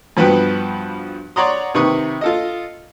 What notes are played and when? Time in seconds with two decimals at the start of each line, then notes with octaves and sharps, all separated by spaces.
0.17 G2 F3 B3 F#4 B4 G5
1.36 C#5 D5 F#5 A#5 C6 D#6
1.74 C3 D#3 B4 C#6 D#6
2.21 F4 A4 D#5